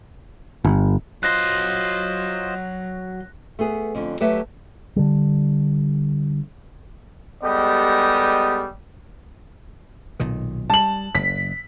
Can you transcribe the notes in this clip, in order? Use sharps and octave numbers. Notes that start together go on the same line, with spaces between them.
G1
F#3 F4 C5 D#5 C6 F#6 A#6
A3 B3 G#4
F2 D3 C#4
F#3 A3 G4 B4 C#5 E5
D3 G3
G3 G#3 B3 G4 A4 D#5
B1 A#2 D#3
G3 A5 F#7
F#1 B6